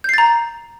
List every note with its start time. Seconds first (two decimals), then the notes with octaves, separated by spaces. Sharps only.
0.04 G6
0.09 C7
0.14 A6
0.18 A#5